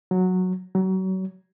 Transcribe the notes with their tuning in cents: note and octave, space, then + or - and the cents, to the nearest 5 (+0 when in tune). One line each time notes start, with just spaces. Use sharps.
F#3 -10
F#3 +30